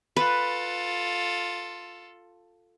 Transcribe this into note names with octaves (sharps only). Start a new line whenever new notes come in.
F4 A4 B4